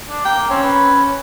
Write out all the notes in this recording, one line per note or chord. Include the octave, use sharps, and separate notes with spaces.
D4
A#3 G5
C4 C#4
B4